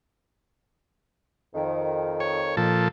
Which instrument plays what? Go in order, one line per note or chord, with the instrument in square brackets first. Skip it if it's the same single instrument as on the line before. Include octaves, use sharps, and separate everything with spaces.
[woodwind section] F2 D#3
[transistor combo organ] C#5
A#2 F3 A4